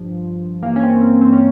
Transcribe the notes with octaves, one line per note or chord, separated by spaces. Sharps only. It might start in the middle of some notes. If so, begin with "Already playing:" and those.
Already playing: G2 F3
G2 E3 A#3
C#4
C4
C4
C4
C#4